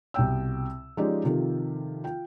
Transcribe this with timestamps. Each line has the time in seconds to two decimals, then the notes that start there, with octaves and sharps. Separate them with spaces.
0.14 C2 B2 G5 E6
0.97 F3 G#3 C#4 D#4 G4 D5
1.24 C3 D#3 F3 F4 G4 A4
2.04 F4 G5